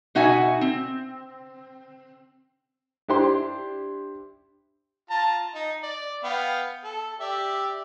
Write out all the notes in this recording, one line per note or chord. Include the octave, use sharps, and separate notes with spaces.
B2 D#4 F#4 E5 G#5
C4
D4 E4 G4 C5 C6
F4 A5 A#5
D#4
D5
B3 F5 G5
A4
G4 D5 E5